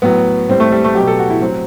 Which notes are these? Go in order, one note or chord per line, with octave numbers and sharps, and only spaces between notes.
A2 F#3 B3
A2 G3 C4
A3
G3
A3
B2 F#3 G4
A4
F#4
E4
A2 F#3 C4